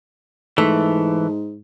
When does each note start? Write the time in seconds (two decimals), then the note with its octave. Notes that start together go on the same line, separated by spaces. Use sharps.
0.58 G#2 E3 A3